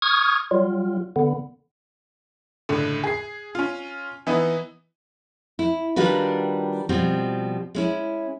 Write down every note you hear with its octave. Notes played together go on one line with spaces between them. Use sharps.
C#6 D#6 F6 G#6
F#3 G3 F4
D3 B3
C#2 A2 D3
G#4 C7
C#4 F4
E3 B3 D#4 E4
E4
D#3 G3 D4 F4 F#4 B4
B2 F3 G3 C4
G#3 C#4 E4